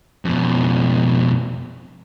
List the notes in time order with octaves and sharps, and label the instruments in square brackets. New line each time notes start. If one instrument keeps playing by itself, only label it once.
[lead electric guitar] F2 B2